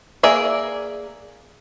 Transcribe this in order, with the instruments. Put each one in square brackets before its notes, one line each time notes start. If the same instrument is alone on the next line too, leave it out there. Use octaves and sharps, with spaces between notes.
[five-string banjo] A#3 G#4 A#4 D5 E5